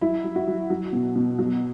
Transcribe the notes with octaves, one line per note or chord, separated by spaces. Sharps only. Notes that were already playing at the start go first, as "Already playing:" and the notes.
F#3 E4
F#3
F#4
F#3
F#3
B2
B2
F#3